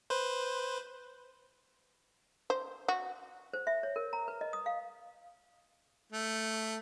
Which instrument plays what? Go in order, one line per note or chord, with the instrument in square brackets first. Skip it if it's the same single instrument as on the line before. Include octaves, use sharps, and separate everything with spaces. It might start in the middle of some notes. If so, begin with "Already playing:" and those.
[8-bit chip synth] B4 C5
[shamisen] C5
F#4
[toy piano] C5
E5
C#5
A#4
A#5
B4
D#5
D#6
F5
[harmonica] A3